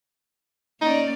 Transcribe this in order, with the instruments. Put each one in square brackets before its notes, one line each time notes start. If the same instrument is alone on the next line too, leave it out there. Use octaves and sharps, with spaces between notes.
[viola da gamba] A#3 C#4 D5 [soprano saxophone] D#4